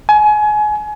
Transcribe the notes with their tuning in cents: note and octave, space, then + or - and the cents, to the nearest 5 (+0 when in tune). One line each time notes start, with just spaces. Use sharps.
G#5 +30